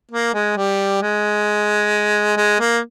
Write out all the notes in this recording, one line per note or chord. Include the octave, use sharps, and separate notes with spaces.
A#3
G#3
G3
G#3
G#3
A#3